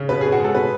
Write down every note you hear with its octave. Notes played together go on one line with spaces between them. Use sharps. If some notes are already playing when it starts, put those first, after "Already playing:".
Already playing: C#3
B2 B4
G#4
B2
F#4
G#3 A4
B2 B4